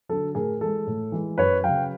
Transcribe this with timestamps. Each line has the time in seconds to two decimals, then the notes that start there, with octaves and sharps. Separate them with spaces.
0.09 D3 F#3 A4
0.35 A2 G#4 A#4
0.61 E3 G#3 A4
0.87 A2
1.12 E3 G#3
1.38 F#2 B4 C#5
1.64 C#3 F#3 F5 G5